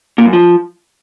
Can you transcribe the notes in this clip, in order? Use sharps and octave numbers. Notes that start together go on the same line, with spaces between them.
A#2
F#2
F3